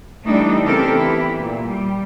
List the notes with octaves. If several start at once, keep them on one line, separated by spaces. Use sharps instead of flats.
E3 G3 A3 D4 D#4 A4
C#3 B3 C4 G4 A4 A#4
E3 E4 G4
A#2
G3